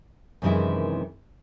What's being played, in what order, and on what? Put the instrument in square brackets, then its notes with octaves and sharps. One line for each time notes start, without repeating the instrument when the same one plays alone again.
[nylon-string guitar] F#2 C3 D#3 E3 G#3 E4